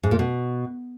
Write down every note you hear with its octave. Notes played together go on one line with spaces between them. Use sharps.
G#2
A#2
B2